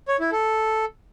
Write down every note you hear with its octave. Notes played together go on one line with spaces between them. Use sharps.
C#5
E4
A4